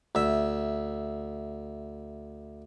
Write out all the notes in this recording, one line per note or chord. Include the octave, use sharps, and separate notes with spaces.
D2 E5